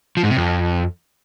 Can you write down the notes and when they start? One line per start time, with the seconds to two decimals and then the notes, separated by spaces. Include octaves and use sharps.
0.17 F3
0.23 G#2
0.30 C3
0.37 F2